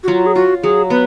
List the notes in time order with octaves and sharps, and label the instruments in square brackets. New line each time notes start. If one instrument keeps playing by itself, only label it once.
[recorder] F#4
[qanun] F#3 [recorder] F4
[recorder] G#4
[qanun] F4 [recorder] F#4
[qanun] F#3 [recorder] G#4
[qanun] B3 [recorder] B4